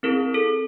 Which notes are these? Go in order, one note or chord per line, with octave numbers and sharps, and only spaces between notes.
C4 E4 G#4 A#4
A4